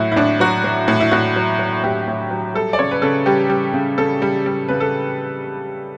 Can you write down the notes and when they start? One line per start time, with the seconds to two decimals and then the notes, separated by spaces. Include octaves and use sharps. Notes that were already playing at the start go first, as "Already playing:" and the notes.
Already playing: A2 F#3 E4 F#4
0.12 E4
0.16 A2 D4
0.40 F#3 F#4
0.64 F#3
0.88 A2
1.00 E4
1.11 A2 F#4
1.36 F#3
1.59 F#3
1.83 A2 G4
2.07 A2
2.31 F#3
2.54 G3 A4
2.73 D5
2.79 C#3 C#5
2.91 B4
3.02 C#3 A4
3.26 G3 G4
3.50 G3
3.74 C#3
3.98 C#3 A4
4.22 G3
4.46 G3
4.69 C#3 B4
4.80 A4